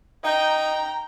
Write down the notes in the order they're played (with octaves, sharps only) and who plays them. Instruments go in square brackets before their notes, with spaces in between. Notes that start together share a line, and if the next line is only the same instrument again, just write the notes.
[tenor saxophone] D#4 [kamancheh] G5 [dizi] A#5